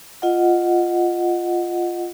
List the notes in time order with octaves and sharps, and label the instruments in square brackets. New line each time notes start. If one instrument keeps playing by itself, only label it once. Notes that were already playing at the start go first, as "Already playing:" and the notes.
[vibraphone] F4 D#5 F#5